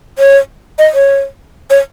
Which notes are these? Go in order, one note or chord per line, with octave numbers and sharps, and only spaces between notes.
C#5
D#5
C#5
C#5